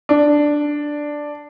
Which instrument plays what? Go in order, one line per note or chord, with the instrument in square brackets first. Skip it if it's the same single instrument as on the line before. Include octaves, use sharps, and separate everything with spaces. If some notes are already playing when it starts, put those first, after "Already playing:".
[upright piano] D4